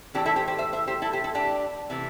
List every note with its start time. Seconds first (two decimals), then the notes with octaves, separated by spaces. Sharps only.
0.14 A2 E3 A3 C4 D4 G4
0.26 E4 A4
0.36 G4 C5
0.48 G4 C5
0.58 C5 E5
0.73 C5 E5
0.87 G4 C5
1.02 E4 A4
1.13 G4 C5
1.24 E4 A4
1.35 D4 G4
1.90 C3 E3 A3